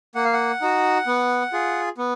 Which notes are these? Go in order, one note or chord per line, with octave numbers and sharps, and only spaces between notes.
A#3 F#5
F5
F#5
D#4 F#4
B3
F4 G#4
B3